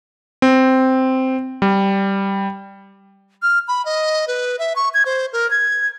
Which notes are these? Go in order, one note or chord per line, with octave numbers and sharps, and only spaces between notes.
C4
G3
F6
B5
D#5
B4
E5
C#6
G#6
C5
A#4
G#6